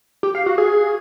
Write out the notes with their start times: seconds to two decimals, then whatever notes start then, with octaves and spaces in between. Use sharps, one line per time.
0.23 G4
0.35 F5
0.46 F#4
0.58 G#4